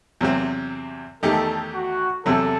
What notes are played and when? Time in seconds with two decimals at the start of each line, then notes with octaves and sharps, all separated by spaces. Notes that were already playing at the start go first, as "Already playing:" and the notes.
0.21 E2 C3 F#3 C4
1.22 E2 D#3 A3 D#4 G4 A4
1.73 F#4
2.25 E2 C3 F#3 A4